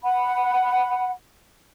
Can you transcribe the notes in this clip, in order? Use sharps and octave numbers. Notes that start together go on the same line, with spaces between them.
F#5 B5